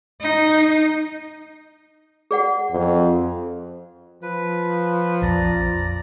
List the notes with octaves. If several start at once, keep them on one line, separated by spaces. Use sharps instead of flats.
D#4
G#4 D5 F#5
F2
F3 B4
A#1 F2 D5 A#5